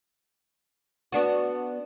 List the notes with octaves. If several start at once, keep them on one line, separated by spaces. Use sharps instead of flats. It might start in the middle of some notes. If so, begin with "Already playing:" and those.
B3 D4 F#4